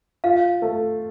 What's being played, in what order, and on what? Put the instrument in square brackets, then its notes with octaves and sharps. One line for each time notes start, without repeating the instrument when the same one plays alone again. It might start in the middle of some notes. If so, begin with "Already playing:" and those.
[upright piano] F4 [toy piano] F5
[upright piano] A3